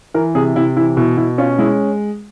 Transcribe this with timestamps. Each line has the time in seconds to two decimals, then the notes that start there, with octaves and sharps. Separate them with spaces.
0.14 E3 A#4
0.35 C3 G#4
0.56 C3 E4
0.76 E3 E4
0.97 B2 E4
1.17 B2 E4
1.38 C#4 F4
1.59 G#3 E4